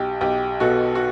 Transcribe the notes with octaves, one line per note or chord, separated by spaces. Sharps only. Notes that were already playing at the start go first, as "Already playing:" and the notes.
Already playing: B1 G4
B1 G4
B2 F#4 A4
F#4